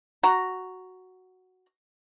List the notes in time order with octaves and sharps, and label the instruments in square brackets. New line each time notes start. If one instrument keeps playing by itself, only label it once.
[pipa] F#4 A#5